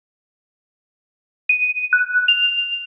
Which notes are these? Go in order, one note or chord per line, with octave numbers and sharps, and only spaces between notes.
D#7
F#6
F7